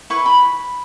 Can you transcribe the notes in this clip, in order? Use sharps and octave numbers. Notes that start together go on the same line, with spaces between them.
E4 B4 C#6
B5